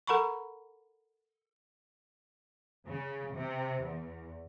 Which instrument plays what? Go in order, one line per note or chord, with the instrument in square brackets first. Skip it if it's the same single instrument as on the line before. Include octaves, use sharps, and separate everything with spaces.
[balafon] A4 A#4 F#5 A#5 B5 C#6
[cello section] C#3
C3
E2